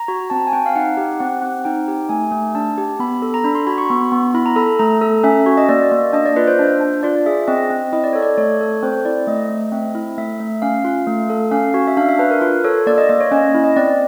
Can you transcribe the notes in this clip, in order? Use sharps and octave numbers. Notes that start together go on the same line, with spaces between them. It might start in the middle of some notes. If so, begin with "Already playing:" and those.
Already playing: A#5
F#4
C4 A5
G#5
C4 G5
F5
D#4 F#5
G4
C4 F#5
C4 F#5
D#4 G5
G4
A3 G#5
A3
D4 A5
G4
B3 B5
A4
A#5
D4 B5
C6
F#4 B5
C#6
B3 B5
B3
E4 B5
A#5
A4 B5
A3 A#5
A4
C#4 E5
F#4
D#5
A#3 D5
A#3
D4 D#5
D5
F4 B4
C5
D4
D4
F4 D5
G#4 E5
C4 D#5
C4
E4 D#5
D5
A4 C#5
D5
A3 C#5
A4
C4 C5
E4 D5
A3 D#5
A3
C4 E5
E4
A3 E5
A3
C#4 F5
F4
A3
A4
C#4 F5
F#4
E5
D4 F5
E5
D4 B4
A#4
F4 B4
A4 C#5
A#3 D5
D#5
A#3 D#5
C#5
C#4 D#5
E4
D#5
C4 D5